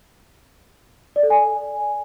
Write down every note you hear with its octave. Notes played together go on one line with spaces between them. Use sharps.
D5
A4
G#5